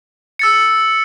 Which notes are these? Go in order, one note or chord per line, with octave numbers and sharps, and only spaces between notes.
E6 A6 C#7